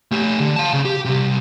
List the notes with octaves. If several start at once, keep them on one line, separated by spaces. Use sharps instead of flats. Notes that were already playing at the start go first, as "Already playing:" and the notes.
A3 G4
D3
F5 A5
C#3
G4
C3 G3